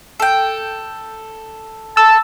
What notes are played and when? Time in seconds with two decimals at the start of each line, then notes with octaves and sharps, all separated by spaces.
0.20 A4 G5
1.97 A5 E6